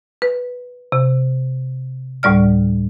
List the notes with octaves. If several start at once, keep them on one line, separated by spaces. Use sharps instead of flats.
B4
C3
D2 A2 G3 D5 F6